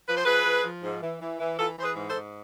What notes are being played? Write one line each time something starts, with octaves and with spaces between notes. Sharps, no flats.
F3 B4
C5
F3 G#4 B4
F3
F3
G#2
E3
E3
E3
E3 F4 A4
E3 C5
G#4 B4
G#2
A4 C5
G#2